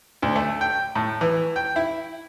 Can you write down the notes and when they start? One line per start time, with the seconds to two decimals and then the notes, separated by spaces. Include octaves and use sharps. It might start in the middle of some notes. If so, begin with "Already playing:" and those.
0.22 D2
0.36 A3
0.61 G5
0.96 A2
1.21 E3
1.56 G5
1.76 E4